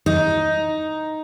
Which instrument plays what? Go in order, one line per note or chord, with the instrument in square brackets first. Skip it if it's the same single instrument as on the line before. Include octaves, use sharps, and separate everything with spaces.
[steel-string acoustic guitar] D#4